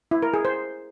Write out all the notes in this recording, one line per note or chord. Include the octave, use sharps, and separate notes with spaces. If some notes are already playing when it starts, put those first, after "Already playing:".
E4
A#4
G#4
C5